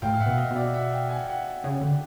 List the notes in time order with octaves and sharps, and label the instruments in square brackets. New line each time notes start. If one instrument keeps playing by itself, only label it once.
[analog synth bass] A2 [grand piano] F5 G5
[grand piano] F5
E5 F#5
[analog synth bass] B2
[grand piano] D#5 F5
[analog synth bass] B2
[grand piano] D5 E5
E5 F#5
F5 G5
F#5 G#5
G5
E5 F#5
[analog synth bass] C#3
D3